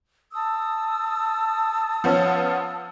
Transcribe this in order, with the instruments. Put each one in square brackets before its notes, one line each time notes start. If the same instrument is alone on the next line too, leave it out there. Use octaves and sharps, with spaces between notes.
[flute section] A5 D#6 E6
[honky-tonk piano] F3 B3 C#4